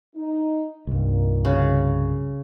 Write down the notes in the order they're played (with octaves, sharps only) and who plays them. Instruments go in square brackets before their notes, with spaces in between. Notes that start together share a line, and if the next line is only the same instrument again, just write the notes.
[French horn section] D#4
[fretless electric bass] C2 G2 [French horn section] A#2 D#3
[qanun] C#3 F#4